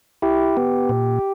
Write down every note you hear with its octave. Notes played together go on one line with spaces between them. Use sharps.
E4 G4
B3
A#2